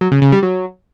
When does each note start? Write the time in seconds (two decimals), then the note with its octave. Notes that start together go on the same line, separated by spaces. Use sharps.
0.01 F#3
0.11 C#3
0.22 C#3
0.32 G3
0.43 F#3